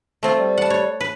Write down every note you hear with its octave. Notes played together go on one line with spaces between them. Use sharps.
A3 C4 F4
G3
F#5 A5
C#5
B4